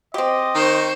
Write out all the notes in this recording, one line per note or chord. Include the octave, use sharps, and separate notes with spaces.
C4 G4 D#5
D#3 C5 C#6